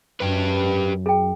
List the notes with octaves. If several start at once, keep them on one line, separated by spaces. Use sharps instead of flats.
F#2 G4 B4
G#4 G5